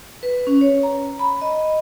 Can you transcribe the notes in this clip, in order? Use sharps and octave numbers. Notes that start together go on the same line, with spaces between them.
B4
C#4
C#5
A#5
B5
D#5